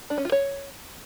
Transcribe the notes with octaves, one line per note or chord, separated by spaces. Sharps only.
D4
C#4
F4
C#5